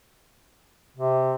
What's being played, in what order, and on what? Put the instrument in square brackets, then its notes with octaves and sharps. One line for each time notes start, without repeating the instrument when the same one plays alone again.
[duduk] C3